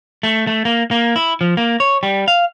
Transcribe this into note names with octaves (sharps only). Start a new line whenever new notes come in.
A3
A3
A#3
A#3
E4
F3
A#3
C#5
G3
F5